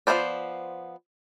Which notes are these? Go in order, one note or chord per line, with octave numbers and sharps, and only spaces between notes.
F3 A#3 B3 C5 D5